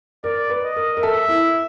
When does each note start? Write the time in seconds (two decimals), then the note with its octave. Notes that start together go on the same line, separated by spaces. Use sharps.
0.24 A#4 D5
0.50 B4
0.64 D#5
0.76 A#4
0.97 A#4
1.02 A4 E5
1.29 E4